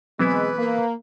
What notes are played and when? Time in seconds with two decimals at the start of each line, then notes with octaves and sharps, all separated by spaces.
0.19 B2 E3 F#3 G#3 B3 C4 E4 B4
0.58 A#3